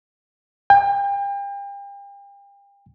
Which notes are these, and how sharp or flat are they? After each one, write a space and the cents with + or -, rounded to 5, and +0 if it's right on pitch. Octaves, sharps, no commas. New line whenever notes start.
G5 +35